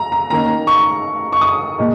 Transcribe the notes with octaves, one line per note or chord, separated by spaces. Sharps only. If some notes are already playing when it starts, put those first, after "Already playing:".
Already playing: A#5
A#5
D#3 A#3 C#4 A#5
C#6
C#6
D#6
A#2 G#3 D#4